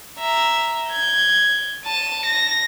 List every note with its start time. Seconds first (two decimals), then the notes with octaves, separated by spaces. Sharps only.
0.19 E5 A#5
0.90 G6 G#6
1.85 A5 D#7
2.26 A#6